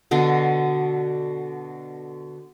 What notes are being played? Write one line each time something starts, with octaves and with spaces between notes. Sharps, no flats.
B2 D3 D4